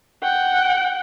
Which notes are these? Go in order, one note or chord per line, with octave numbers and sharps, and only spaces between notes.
F#5 G5